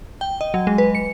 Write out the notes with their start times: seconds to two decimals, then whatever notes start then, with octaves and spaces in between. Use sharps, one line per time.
0.21 G5
0.41 D#5
0.54 F#3
0.67 G#3
0.78 B4
0.95 C#7